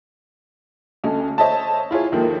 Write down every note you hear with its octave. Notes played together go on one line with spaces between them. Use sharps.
D2 C#4 A4 D#5
C5 C#5 D#5 E5 A5
E4 F4 G#4 C#5
D#2 D#3 F3 A3